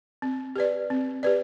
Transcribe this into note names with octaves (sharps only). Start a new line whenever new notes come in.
C4
G4 B4 D5
C4
G4 B4 D5